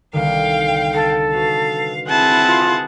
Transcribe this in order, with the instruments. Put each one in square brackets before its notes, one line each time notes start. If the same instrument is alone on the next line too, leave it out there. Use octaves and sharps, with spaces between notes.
[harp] C2 D3 D#3 [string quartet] F5 G5
[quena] A4
[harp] F#4 B4 [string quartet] F5
[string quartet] C4 E4 G#4 [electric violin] F#5 A5
[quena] F4